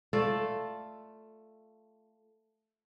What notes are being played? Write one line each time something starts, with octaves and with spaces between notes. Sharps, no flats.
A3 F4 A4 D5